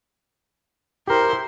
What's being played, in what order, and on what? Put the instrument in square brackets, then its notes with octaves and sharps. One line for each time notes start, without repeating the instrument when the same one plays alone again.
[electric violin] E4 C5 [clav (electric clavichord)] G4 A#4